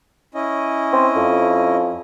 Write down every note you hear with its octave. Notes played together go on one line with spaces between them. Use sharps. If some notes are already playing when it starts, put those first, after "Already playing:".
C#4 E4 D#5
C4
F2